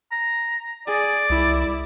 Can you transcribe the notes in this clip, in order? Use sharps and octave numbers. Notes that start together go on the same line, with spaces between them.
A#5
G#4 D5
C2 E4